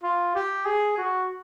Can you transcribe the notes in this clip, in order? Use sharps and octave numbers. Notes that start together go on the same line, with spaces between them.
F4
G4
G#4
F#4